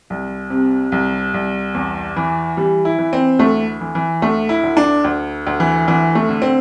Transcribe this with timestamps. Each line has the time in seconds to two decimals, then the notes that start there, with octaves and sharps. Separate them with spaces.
0.10 C2
0.50 C3
0.92 C2
1.34 C2
1.75 E2
2.16 E3
2.57 E3 G3
2.85 E4
2.99 E3
3.13 C4
3.39 D2 A3
3.81 E3
3.95 E3
4.22 D2 A3
4.49 E4
4.63 D2
4.77 D4
5.04 D2
5.47 D2
5.60 E3
5.87 D2 E3
6.15 A3
6.29 D3
6.42 C4